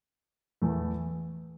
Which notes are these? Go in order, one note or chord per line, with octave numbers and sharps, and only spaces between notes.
E2 E3 A3